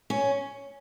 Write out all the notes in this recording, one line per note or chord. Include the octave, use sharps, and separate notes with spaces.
C#4